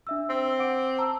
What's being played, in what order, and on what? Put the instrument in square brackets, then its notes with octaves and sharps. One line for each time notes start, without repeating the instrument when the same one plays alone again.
[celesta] D4 E5 E6
[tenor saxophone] C4
[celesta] F#5 D6 D7
A5 A#5 E6